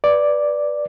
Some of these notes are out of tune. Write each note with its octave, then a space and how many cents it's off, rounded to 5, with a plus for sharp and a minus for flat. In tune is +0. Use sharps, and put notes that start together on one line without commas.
B4 -10 D5 +0